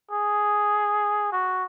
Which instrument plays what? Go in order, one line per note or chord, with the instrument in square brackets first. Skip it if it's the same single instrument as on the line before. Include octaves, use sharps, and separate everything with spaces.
[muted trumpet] G#4
F#4